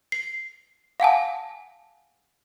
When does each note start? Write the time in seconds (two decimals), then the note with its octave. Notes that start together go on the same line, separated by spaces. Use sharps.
0.12 C7
1.00 F5 F#5 G#5 A5